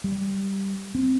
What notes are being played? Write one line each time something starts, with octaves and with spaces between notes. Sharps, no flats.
G3
C4